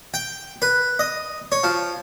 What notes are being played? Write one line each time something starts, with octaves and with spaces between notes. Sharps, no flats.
G5
B4
D#5
C#5
F3